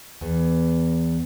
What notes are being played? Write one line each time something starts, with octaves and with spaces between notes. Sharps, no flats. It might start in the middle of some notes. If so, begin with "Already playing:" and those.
E2